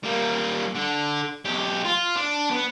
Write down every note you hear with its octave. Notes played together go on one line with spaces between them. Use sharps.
G3 A#3
D3
B1 G4
F4
D4
B3